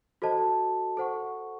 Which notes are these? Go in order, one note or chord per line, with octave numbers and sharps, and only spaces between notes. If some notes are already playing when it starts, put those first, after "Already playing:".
F#4 A4 C5 D#5 A5
A4 C5 F#5 C#6